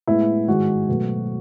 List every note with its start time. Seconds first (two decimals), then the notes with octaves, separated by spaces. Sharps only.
0.07 A2 G#3 B3 E4
0.48 G#2 D#3 G#3 F#4
0.88 B2 F#3 A3